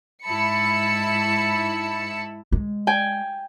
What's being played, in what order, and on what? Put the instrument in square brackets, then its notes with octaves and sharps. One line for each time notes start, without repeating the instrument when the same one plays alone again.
[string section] G#2 E4 A5 B5 C#7
[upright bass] G#3
[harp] G5 G#5